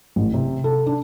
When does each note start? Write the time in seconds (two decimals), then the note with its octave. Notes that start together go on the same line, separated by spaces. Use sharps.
0.16 A1
0.34 C3
0.64 A4
0.86 D4